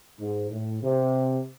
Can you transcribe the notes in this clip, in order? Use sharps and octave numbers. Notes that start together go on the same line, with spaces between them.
G#2
A2
C3